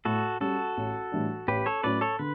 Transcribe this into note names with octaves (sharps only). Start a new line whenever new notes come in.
A2 F#4 A4
G3 C#4 F#4 A4
A1
A2 E3 G3 D4
A1 G4 B4
A4 C#5
A2 F#3 C#4 B4 D5
A4 C#5
D3 B4